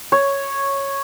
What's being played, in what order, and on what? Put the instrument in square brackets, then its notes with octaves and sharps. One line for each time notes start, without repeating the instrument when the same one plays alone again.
[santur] C#5